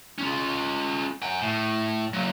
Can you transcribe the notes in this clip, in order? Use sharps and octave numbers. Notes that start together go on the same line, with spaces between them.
C#4 F4
F#5 G#5
A2
F#3 A#3